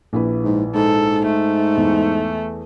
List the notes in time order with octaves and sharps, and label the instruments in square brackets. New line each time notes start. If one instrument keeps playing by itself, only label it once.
[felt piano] A#1 E4 B4
[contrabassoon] G#2
[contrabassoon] G#2 [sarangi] A4
[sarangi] A3
[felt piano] E2